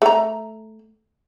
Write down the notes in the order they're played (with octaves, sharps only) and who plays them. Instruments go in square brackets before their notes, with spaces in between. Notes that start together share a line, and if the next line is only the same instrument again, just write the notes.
[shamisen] A3 A#5